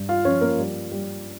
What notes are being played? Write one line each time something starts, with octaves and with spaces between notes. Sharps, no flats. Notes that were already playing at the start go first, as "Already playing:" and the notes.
Already playing: G2
F4 F5
F3 C#4 C#5
A#3 A#4
G3
G3